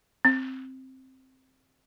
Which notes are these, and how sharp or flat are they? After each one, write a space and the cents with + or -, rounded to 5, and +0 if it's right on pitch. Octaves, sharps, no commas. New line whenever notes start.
C4 +5